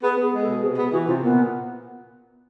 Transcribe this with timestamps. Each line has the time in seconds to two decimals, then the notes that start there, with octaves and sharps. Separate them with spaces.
0.03 B3 G#4
0.17 B3
0.22 G#4
0.32 G#3
0.42 A4
0.48 B2
0.63 C3 G#4
0.77 B3 G#4
0.92 E3 F#4
1.08 C3 F4
1.23 A#2 B3